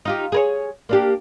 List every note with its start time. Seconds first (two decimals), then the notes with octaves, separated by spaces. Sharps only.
0.05 D#4 F4 G4
0.32 G#4 A#4 C#5
0.89 A#3 D4 G4